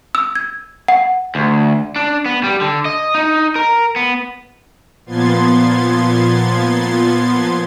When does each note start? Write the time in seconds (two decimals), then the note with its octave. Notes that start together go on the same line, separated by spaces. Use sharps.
0.15 E6
0.35 G#6
0.88 F#5
1.35 D2
1.96 D4
2.26 B3
2.43 G3
2.61 D3
2.85 D#5
3.15 D#4
3.56 A#4
3.96 B3
5.06 A#2 F3 B3 C6 G#6 A6